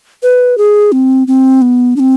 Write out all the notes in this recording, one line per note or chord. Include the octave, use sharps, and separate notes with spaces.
B4
G#4
C4
C4
B3
D4
C4